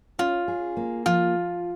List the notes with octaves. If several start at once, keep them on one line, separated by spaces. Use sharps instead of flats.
C#4 F4
G#4
A#3
F3 F4